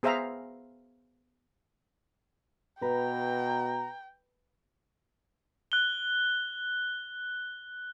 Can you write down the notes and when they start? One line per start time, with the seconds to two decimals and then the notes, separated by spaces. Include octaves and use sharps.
0.03 B3 G#4 C5 E5 F5 A#5
2.82 B2 B4 G5 A#5
5.72 F#6 G7